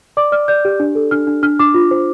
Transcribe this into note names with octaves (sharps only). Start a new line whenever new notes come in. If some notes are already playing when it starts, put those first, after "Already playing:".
D5 D6
D5 F6
D5 G6
G4
D4
A4
D4 F6
D4
D4 F6
D4 D6
F4
C5